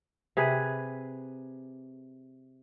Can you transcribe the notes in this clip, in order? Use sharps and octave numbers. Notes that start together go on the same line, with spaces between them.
C3 G#4 B4